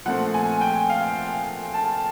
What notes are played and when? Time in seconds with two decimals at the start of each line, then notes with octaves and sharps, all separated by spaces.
0.05 A#2 F3 A3 C4 F#5
0.34 G#5
0.61 G5
0.90 F5
1.74 A5